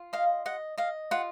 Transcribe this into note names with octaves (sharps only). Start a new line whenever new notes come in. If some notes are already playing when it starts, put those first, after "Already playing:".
Already playing: F4
D#5 F5
D#5 F#5
D#5 F5
F4 F#5